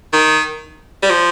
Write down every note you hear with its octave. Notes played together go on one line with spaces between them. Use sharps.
D#3
G3
F3